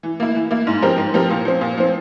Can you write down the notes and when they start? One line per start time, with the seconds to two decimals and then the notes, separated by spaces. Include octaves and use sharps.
0.03 E3
0.20 A#3 E4
0.35 E3
0.51 A#3 E4
0.67 G#2
0.82 F3 C4 G4 A#4
0.98 G#2
1.14 F3 C4 G4 A#4
1.30 A#2
1.45 F3 C4
1.61 A#2
1.78 F3 C4